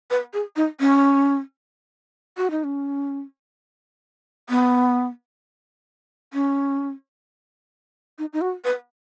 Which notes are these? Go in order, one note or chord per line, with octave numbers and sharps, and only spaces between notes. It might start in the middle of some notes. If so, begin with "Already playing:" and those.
B4
G#4
D#4
C#4
F#4
D#4
C#4
B3
C#4
D#4
D#4
F#4
B4